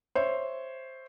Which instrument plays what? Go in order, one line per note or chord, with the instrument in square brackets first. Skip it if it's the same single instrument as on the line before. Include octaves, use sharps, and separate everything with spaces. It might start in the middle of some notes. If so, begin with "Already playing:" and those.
[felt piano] C5 C#5 E5